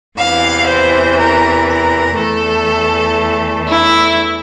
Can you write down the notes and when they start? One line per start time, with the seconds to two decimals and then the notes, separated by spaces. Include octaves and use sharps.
0.18 E2 C3 E3 F5
0.68 C5
1.19 A#4
1.68 A#4
2.17 E2 E3 A3 A4
3.67 E4